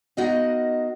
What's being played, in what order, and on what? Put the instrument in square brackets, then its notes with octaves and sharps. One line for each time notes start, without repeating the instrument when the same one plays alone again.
[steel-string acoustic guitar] B3 D#4 F#4 A#4 D#5 F5